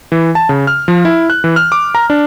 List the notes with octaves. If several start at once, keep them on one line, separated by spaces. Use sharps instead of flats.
E3
A5
C#3
F6
F3
E4
F#6
E3
F6
D6
A#5
D4